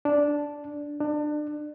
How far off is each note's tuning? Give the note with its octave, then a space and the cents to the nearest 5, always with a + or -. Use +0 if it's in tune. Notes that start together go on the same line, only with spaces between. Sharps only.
D4 -5
D4 +30